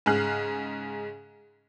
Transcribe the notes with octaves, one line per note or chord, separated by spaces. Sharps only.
G#2 C#3 G#4 F6 F#6 C7